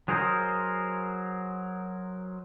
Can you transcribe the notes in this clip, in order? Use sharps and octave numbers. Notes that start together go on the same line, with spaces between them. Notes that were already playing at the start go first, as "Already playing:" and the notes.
F#3 G#4 A#4 C5 D#5